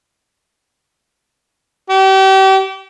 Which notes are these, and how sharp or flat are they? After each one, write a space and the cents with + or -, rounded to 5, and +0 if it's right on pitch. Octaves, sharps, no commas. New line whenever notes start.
G4 -35